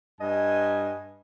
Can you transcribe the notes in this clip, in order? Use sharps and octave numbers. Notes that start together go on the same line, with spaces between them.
G2 D#5 G#5